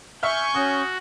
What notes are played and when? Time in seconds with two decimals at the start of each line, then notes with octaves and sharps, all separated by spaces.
0.23 E5 G#5 C#6 F6 G6
0.54 C#4 F#4 D#6